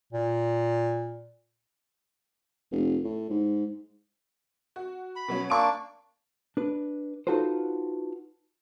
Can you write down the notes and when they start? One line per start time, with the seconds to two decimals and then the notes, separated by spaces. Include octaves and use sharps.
0.13 A#2
2.71 F1
3.04 A2
3.30 G#2
4.76 F#4
5.16 B5
5.28 B2 F#3 C#4
5.50 A#3 D4 D5 C#6 D7
6.57 D4 B4
7.27 D#4 F4 F#4 A4 B4 C5